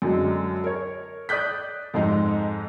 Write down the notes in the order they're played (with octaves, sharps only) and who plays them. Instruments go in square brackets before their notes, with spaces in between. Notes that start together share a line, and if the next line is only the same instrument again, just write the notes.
[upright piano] F#2 D3 F#3 G#3
A#4 C#5
D5 D#6 F#6 G6 B6
F2 G#2 G#3 D#4